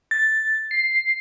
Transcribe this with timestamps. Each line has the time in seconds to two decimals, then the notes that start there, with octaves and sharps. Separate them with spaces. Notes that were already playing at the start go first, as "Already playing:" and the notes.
0.11 A6
0.71 C7